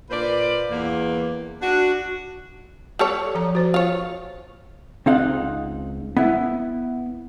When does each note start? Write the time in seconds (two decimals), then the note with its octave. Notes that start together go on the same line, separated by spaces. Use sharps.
0.10 A#2 B4 C5 D5
0.70 E2 A#3
1.62 D4 F#4
2.99 G3 A4 C#5
3.35 F3 A#5
3.55 F#4 C5
3.74 F4 C#5
5.06 C#2 C4 D#4 F5 F#5
6.17 B3 E4